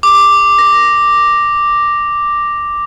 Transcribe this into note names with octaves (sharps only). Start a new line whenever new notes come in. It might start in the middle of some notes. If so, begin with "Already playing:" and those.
D6
A#6